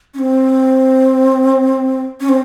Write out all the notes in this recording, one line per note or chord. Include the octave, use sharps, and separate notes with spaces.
C#4
C4
C#4
C4